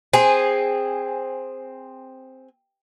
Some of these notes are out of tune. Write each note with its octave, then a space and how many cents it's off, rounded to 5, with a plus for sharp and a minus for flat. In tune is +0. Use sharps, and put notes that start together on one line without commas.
C4 +0 G#4 -15 G#5 -5